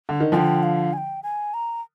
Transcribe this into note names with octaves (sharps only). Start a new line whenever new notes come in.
D3
D#3
D3 F3 G5 G#5
F5
G#5
G5
G#5
A#5